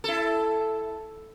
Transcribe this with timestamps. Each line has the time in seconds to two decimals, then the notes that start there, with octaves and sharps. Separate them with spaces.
0.04 E4 A4